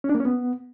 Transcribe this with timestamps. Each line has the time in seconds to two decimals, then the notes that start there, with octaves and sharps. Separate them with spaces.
0.04 C#4
0.09 D4
0.15 A#3
0.20 C#4
0.25 B3